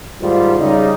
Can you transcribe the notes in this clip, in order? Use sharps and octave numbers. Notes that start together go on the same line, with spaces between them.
G#2 D#3 G3 A3 F4
C#3 G3 D#4